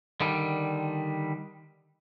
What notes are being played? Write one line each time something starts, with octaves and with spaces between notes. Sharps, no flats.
D3 D#3 G3